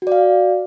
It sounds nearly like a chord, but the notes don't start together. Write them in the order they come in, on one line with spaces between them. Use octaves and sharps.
F#4 D5 F5